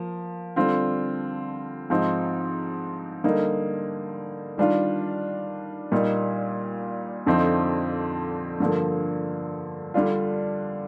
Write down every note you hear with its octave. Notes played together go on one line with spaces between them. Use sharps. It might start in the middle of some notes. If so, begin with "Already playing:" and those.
Already playing: F3 A#3
D3 G3 C4 F4
G#2 F3 C4 D#4
D3 G3 A#3 D#4
D#3 G3 D4 F4
A#2 G3 A#3 D#4
F2 D3 F3 C4 D#4
G2 D3 F3 A#3
D3 G3 D4 F4